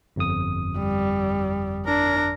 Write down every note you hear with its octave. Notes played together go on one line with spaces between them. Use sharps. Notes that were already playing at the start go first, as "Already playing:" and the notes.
G1 F2 D#6
G3
D4 A#4